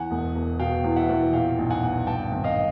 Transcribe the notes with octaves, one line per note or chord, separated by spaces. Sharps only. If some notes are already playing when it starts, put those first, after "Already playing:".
Already playing: E2 F#5 G#5
E1
E1
B2 F5 G5
E2
E5 F#5
E2
A#2 F5 G5
B1
F#5 G#5
B1
G2 G5 A5
G#1
D#5 F5